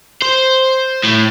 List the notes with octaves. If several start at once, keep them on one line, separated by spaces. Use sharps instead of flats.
C5
A2